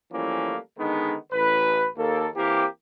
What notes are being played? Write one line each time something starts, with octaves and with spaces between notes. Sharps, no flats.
E3 F3 G3 A3 A#3 C#4
D3 D#3 G#3 B3 D#4
A1 B4
D#2 A#3 A4
E3 A#3 C4 G4